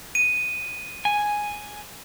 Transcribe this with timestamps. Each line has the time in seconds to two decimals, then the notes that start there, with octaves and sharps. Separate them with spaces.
0.15 D#7
1.05 G#5